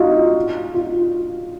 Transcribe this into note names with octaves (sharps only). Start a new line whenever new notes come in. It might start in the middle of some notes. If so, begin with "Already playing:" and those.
Already playing: D#4 F4 F#4
F4